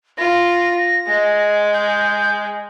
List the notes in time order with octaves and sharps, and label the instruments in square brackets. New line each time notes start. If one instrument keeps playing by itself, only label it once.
[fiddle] F4 [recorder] A#6
[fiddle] G#3
[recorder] G6